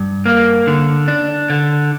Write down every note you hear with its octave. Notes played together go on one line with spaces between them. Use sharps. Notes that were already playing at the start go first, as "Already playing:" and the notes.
Already playing: G2
A#3
D3
D4
D3